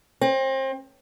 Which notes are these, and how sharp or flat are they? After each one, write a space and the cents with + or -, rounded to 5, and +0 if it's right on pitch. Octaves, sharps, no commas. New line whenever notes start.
C4 +30